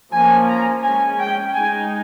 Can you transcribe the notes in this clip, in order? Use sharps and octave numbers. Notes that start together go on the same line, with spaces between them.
F3 A#3 C#4 G#5
A#5
G#3 C#4 G#5
G5
G#3 D#4 G#5